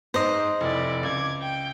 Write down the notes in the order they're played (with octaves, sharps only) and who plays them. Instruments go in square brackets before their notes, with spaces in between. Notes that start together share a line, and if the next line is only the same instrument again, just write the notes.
[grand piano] G#2 [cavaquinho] C5 D#5
[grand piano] F1 [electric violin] E4 D5
[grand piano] C#2 [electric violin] D6 G#6
[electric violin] G5